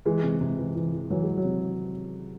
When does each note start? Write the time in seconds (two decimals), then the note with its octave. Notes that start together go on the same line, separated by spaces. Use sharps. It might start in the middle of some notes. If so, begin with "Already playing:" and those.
0.05 E3 G#3
0.23 C3
0.41 C3
0.58 E3
0.75 E3
0.93 E3
1.10 E3 F#3
1.23 E3 G#3
1.37 F#3
1.45 C3